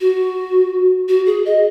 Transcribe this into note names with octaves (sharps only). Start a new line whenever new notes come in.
F#4
F#4
G#4
D#5